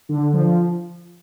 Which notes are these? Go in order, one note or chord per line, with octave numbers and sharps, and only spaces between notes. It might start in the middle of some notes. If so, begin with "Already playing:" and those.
D3
F3